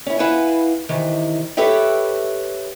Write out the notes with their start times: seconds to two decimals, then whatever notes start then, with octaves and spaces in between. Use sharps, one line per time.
0.06 C#4 E4
0.19 E4 B4 F5 F#5 G#5
0.89 C3 D#3 E3
1.57 G4 A4 B4 C#5 E5 G5